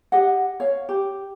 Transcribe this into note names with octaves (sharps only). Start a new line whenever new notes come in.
G4 D#5 F#5
C#5 F5
G4